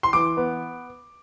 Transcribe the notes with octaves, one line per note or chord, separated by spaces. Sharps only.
C6
E3 D6
B3